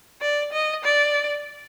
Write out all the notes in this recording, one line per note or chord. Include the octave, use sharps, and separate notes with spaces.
D5
D#5
D5